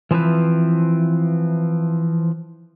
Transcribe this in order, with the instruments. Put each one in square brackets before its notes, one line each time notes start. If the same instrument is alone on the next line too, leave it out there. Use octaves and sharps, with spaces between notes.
[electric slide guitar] E3 F3 C4 E4 B4